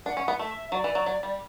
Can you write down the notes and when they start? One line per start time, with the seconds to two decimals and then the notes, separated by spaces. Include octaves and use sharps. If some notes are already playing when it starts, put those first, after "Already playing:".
0.06 D4 F#5
0.17 C#4
0.28 B3
0.39 A3 E5
0.72 F#3 D5
0.84 E3
0.95 F#3
1.06 F#3
1.23 G3